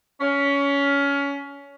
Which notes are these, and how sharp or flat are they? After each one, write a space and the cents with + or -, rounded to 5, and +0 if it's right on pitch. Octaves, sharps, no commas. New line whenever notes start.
C#4 +20